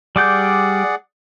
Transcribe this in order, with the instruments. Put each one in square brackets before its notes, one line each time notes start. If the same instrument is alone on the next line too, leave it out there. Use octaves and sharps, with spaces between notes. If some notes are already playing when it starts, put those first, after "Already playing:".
[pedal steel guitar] G3 D6 G6 [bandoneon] G#4 D5 F#5